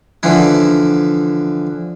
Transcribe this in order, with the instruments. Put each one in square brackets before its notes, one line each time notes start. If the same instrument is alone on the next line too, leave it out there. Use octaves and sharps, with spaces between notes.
[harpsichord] D3 E3 F3 E4